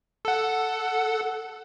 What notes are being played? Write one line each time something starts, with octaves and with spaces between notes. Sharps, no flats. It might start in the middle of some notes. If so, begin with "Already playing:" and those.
A4 F#5